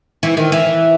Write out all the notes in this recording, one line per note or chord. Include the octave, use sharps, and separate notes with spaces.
E3
D#3
E3